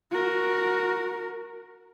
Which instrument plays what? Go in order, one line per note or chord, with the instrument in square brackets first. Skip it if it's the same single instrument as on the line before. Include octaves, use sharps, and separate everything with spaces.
[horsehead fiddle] F#4 A#4